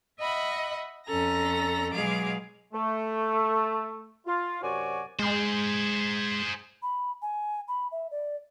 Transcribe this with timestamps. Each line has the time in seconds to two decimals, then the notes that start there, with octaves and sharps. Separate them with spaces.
0.19 D#5 E5 F#5 B5
1.07 F2 C#4 A4 A#5 A#6
1.92 B2 F#3 G#3 G#4 F5 D6
2.74 A3
4.27 F4
4.62 F#2 C3 F#4 C#5 D5 G#5
5.19 G#3 G#4 C5
6.82 B5
7.22 G#5
7.68 B5
7.92 E5
8.11 D5